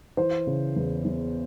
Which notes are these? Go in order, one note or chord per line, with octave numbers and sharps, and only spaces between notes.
E3 C5
C#3
E2
E2